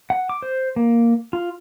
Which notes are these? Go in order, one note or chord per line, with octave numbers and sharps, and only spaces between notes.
F#5
D6
C5
A#3
F4